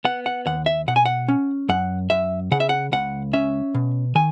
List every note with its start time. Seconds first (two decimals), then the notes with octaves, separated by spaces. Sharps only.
0.05 B3 F#5
0.26 F#5
0.46 D#2 F#5
0.66 E5
0.88 B2 F#5
0.96 G#5
1.06 F#5
1.28 C#4
1.69 F#2 F#5
2.10 F#2 E5
2.51 C#3 F#5
2.60 E5
2.69 F#5
2.92 C#2 F#5
3.33 C#4 E5
3.74 B2
4.15 D#3 G#5